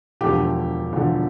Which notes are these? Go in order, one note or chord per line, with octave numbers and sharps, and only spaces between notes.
E1 D2 D3 F3 G4
E1 D2 D3 F3